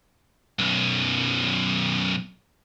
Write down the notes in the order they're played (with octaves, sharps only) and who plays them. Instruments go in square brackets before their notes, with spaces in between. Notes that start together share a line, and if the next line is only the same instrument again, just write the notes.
[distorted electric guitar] B1 F#2